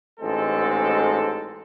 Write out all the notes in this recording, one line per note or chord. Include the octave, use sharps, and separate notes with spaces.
A1 G#2 G#3 C4 A4